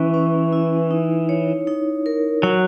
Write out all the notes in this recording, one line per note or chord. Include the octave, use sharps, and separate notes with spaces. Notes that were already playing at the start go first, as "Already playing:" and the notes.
Already playing: E3 C#4 B4
C#4
E4
D#4
C#5
D#4
A#4
F#3 F#5